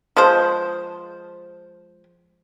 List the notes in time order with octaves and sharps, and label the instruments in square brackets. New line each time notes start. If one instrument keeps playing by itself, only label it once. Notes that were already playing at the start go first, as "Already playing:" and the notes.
[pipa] F3 G#3 C5